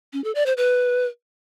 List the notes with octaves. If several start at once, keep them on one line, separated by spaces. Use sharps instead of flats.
C#4
A4
D5
C5
B4